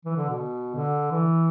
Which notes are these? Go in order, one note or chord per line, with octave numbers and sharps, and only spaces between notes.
E3
D3
B2
D3
E3